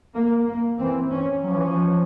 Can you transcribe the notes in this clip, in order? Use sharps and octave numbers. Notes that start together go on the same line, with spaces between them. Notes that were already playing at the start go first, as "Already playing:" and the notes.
A#3
A#3
E3 C4
C#4
F#3 C#4
F3
E3
F3